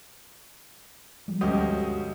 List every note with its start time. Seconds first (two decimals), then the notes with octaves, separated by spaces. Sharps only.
1.28 F3 G3 G#3
1.41 D2 G2 B2 C#4 G4 D#5